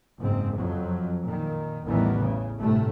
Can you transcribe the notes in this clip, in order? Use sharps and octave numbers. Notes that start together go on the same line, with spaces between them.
F#1 G#2 C4
F2 F#3
A#2 D#3
A1 E2 D#3 E3 G3 B3
C#3
G1 A2 C3 A3